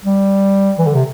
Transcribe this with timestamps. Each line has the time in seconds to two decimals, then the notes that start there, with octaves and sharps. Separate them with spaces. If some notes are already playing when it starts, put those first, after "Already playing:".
0.05 G3
0.78 E3
0.87 D3
0.95 C3